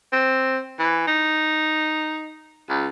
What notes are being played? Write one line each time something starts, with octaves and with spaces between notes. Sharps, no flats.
C4
E3
D#4
C#2